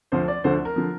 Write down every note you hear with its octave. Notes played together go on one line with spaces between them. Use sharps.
D2 D3 F3 C5
D5
D2 D3 F3 C5
A#4
D3 F3